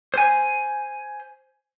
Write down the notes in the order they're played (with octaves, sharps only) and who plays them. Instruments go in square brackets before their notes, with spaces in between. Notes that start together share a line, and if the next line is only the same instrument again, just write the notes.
[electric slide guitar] C5 G#5